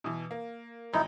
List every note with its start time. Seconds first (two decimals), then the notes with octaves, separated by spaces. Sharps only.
0.04 B2 E3
0.31 A#3
0.94 G#1 D#4 E4 A#5